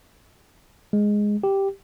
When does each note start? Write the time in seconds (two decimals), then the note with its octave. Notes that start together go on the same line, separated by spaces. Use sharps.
0.93 G#3
1.44 G4